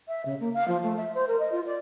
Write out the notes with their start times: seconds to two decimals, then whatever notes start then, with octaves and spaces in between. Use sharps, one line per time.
0.08 E5
0.25 C#3
0.40 A#3
0.54 F5
0.68 F3
0.83 A3
0.97 E5
1.14 C5
1.27 A#4
1.39 D#5
1.52 F4
1.66 D5